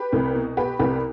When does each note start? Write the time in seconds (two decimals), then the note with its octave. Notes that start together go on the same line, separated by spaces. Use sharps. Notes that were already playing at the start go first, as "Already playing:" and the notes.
Already playing: G4 B4
0.13 C2
0.35 B2
0.57 B2 G4 B4
0.79 C2 G4 B4